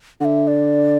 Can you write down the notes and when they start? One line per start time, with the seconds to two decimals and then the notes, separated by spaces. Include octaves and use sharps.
0.21 D3 F#5
0.25 E5
0.47 D5